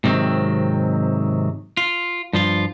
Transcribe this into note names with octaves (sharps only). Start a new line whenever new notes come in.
G#2 C3 D#3 F#3 C4
F4
G2 F3 F4